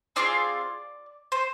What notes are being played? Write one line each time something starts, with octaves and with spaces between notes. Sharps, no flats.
C4 D4 F4 G#4 D5
C5